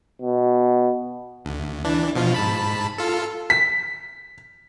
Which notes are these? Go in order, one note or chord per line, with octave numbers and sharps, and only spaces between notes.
B2
D2
E3 D4
B2 F3 F4
G#2 A5 B5
F4 A4
B6